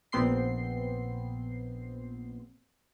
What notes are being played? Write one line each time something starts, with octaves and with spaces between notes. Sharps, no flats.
A#1 B3 C4 C6 C7